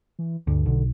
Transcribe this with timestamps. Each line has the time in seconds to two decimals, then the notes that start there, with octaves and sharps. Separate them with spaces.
0.19 E3
0.47 D2 G2
0.66 B1 D3